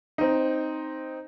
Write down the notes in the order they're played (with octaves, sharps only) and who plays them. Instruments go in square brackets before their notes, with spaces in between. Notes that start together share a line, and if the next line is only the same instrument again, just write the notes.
[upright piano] C4 D#4